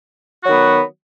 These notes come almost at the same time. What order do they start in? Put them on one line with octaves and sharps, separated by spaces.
F#4 F#3 D#3 B3